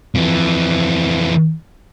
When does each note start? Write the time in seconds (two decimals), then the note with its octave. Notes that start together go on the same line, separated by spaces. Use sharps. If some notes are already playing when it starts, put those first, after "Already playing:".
0.15 F2 E3